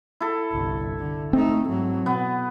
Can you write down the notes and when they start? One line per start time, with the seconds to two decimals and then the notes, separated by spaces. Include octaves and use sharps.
0.21 E4 A4
0.52 G1 C2
0.98 D3
1.33 A3 C4 D#4
1.69 G#2 F#3
2.06 B2 B3